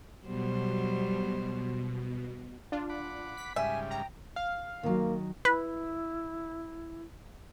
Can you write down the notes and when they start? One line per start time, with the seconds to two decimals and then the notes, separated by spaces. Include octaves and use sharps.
0.25 B2 F#3 G3 C5
2.72 D4 F4
2.89 F#5 B5 D6
3.37 B6
3.56 G#2 C#3 G3 E5 G#5
3.91 G5 A#5
4.36 F5
4.83 D#3 F#3 A#3
5.45 E4 B4